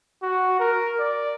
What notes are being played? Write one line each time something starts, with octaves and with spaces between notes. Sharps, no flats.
F#4
A#4
D5